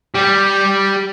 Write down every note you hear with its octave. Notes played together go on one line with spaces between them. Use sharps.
G3